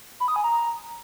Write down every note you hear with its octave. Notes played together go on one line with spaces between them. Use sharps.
B5
D#6
G#5
A#5